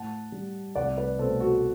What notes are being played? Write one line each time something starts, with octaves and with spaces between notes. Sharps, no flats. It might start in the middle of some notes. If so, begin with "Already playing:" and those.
Already playing: A2 F#5 A5
G3
C2 D5 F#5
B4 D5
B2 A3 A4 C5
F#4 A4